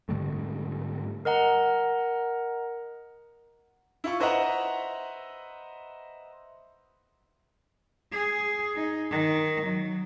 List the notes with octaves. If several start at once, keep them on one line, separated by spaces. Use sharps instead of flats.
G#2 D3 G3 A3
A#4 D#5 F#5 A#5
E4 F4 C#6
B4 C5 D#5 E5 F#5 A#5
G#4
D#4
D#3
F#3